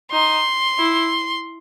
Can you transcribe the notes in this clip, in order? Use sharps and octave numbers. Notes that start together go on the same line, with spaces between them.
D#4 C6
E4